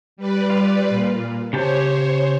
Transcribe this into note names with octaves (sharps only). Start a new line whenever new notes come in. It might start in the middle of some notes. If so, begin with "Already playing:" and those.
G3 B4 D5
F4
A#2
C#3 G4 C5 C#5 A5